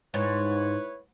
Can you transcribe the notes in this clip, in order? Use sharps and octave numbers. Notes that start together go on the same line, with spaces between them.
G#2 E4 B4 C#5